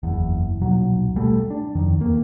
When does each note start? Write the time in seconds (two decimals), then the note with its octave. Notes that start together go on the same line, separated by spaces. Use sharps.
0.03 F#1 E2
0.61 D#1 B1 F#3
1.16 B2 G3 A3
1.50 D4
1.75 F2 D#3
1.98 E2 A#3